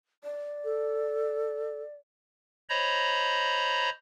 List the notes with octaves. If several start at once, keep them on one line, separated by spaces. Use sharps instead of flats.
D5
A4
C5 C#5 D#5 A#5 B5